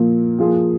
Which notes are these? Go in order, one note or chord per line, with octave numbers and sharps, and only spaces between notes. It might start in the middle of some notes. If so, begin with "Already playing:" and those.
Already playing: A#2 F3 A#3
F3 A#3 F4 G#4